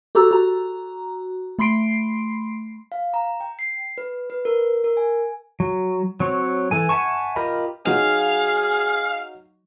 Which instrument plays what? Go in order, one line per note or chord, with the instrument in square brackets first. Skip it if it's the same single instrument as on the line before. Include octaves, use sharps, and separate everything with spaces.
[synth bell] F#4 G4 A4 A#5 E6
F#4 A#5
A3 B5 C6 C7 D7
[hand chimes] F5
A#5
G5
C7
B4
B4
A#4
A#4
G#5
[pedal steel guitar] F#3
F#3 C4 C#5
E3 A4 G#5
E5 F#5 G#5 A5 C#6
F4 G4 A#4 D#5 B5
[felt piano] F#3 D#4 [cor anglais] G#4 [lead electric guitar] F5